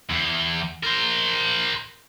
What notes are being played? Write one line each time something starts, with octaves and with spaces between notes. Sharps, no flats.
E2
A#4 C5